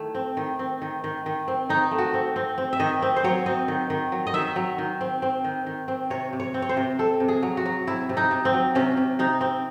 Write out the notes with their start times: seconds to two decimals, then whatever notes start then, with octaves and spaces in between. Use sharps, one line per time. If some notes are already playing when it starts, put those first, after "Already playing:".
Already playing: D#3 A3 E4
0.15 C4
0.37 D#3
0.59 C4
0.82 D#3
1.04 D#3
1.26 D#3
1.48 C4
1.69 D#3 D#4
1.91 A3
1.98 F#4
2.14 C4
2.36 C4
2.58 C4
2.73 E5
2.80 D#3 D#5
3.02 C4
3.16 C5
3.24 F#3 C#5
3.46 C4 D#5
3.68 D#3
3.90 D#3
4.12 F#3
4.27 D#5
4.34 D#3 E5
4.56 F#3
4.78 D#3
5.01 C4
5.22 C4
5.44 D#3
5.66 D#3
5.88 C4
6.10 C3 C#5
6.33 C3
6.40 C#5
6.54 C4
6.62 C#5
6.69 C5
6.77 C3
6.99 C4 A4
7.20 C3
7.28 G#4
7.43 F#3
7.57 F#4
7.65 F#3
7.87 C3 E4
8.09 C3
8.17 D#4
8.31 C3
8.45 C4
8.53 F#3
8.75 C3 C#4
8.97 C3
9.19 C3 D#4
9.41 C4